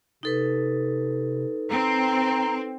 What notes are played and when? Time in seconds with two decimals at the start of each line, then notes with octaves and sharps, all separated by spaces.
0.23 C3 D#4 A4 B4
1.70 C4 A#5